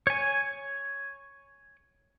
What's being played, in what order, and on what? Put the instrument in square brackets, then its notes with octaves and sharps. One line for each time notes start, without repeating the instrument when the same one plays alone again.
[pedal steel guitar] C#5 G#5